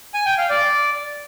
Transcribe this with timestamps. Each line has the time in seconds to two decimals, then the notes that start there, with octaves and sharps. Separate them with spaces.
0.14 G#5
0.26 G5
0.38 F5
0.50 D5